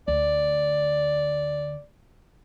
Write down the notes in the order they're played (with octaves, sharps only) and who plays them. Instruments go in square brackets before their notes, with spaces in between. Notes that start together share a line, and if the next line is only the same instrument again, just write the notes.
[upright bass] D2 [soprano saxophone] D5